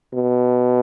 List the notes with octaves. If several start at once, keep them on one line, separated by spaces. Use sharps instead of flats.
B2